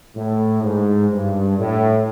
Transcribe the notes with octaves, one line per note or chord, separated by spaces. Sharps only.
A2
G#2
G2
A2